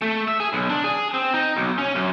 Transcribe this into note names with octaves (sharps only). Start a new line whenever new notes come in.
A3
E5
G#4
B1
D4
G#4
C4
D#4
B1
C#4
F#2